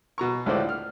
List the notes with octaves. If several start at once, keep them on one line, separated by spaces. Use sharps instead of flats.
B2 A#5 C#6
C#2 A2 D3 C5 D5
F6